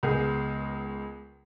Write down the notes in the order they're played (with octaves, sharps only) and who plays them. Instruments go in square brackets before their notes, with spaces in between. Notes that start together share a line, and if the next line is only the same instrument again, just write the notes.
[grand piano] C#2 B3 G#4 A#4